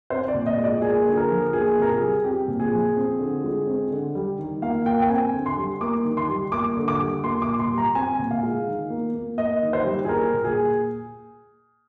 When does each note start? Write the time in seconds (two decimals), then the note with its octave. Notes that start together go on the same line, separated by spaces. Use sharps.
0.10 C4 C5
0.28 D5
0.34 A#2
0.46 D#5
0.58 G#3
0.64 D5
0.82 A#3 G#4
1.06 D3
1.14 G#4
1.17 A#4
1.30 F3
1.53 A#3 G#4
1.77 C3 A#4
1.89 G#4
2.01 G3
2.24 C4 G4
2.48 A#2
2.60 G#4
2.72 F3
2.96 C4
3.19 D3
3.44 G#3
3.67 C4
3.91 D3
4.15 G3
4.38 D#3
4.62 A#3 F5
4.86 A#3 G5
5.02 G5
5.09 C4 G#5
5.33 D3
5.46 C6
5.57 G3
5.81 A#3 D6
6.05 D#3
6.17 C6
6.29 G3
6.52 A#3 D6
6.77 D3
6.88 D6
7.00 G3
7.24 A#3 C6
7.42 D6
7.47 A#2
7.59 C6
7.71 G3
7.78 A#5
7.95 C4 G#5
8.19 A#2
8.31 F5
8.43 G#3
8.67 D#3
8.90 A#3
9.14 A#3
9.37 A#3 D#5
9.62 D#3
9.73 C5
9.85 G3
10.05 G#4
10.09 A#3 A#4
10.33 A#2
10.44 G#4